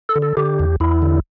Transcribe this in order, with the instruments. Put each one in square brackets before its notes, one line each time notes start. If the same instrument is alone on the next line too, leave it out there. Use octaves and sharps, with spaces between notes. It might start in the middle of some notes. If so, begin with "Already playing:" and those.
[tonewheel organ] A4
D3
A4
D3 G4
E2
E2 E4
D3